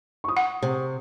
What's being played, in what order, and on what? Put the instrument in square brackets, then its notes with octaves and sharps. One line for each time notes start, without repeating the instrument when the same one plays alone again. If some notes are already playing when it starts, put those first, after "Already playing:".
[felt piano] C#6 D#6
[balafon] F#5
[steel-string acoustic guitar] C3